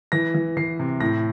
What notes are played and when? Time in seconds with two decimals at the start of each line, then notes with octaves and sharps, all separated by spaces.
0.12 E3 A#6
0.35 E3
0.57 E3 C7
0.80 C3
1.01 A2 A#6